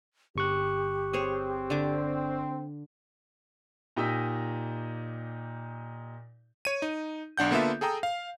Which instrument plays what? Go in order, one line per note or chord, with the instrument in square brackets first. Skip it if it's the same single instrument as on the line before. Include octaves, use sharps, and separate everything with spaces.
[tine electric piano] G1 C#6 F#6 [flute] G4
[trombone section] C4 [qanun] G#4 C5 C#5
[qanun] D3 D4 D6
[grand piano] A#2 D#4 G4 D#5 E6 B6
[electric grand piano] C#5 D#7
D#4
B1 D4 F#5 G6
D3 A#3 B3 F4 A4 E5
G#4 A4 G5 A#5 D#6
F5